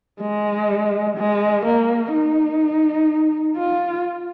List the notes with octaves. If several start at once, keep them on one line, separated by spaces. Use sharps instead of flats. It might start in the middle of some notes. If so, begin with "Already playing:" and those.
G#3
G#3
A#3
D#4
F4